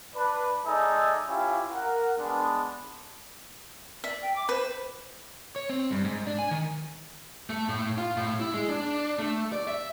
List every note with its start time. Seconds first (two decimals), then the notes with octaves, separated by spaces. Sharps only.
0.15 D4 B4
0.65 G#3 D#4 A4 D5 E5 G#5
1.28 C#4 E4 F4 G4 F5
1.72 A#4 F#5
2.18 G#3 B3 D4
4.04 D5 E5
4.22 G5
4.36 D6
4.49 B4 C5
5.56 C#5
5.70 C4
5.91 G2
6.04 G#2
6.27 D4
6.39 G#5
6.51 D#3
7.50 A3
7.69 A2
7.98 F4
8.17 A2
8.40 E4
8.54 G#3
8.69 D4
9.19 A3
9.52 D5
9.68 E5